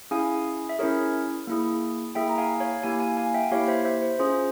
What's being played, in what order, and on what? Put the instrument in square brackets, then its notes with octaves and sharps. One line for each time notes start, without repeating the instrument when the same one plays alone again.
[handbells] C#4 E4 G#4 F5 G#5
E5
C#4 E4 G#4 A#4 C#5
A#3 E4 G#4
A#3 E4 G#4 E5 G5
A#5
F5 G#5
C#5 F5
A#3 E4 G4 F5 G#5
F5 G#5
F5 G#5
E5 G5
A#3 E4 G4 C#5 F5
C5 E5
C5 E5
C5
C#4 F4 G#4 C5